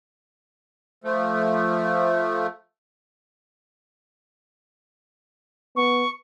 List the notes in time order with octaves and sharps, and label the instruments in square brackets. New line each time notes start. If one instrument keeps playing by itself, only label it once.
[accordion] F3 A3
[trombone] B3 [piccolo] C#6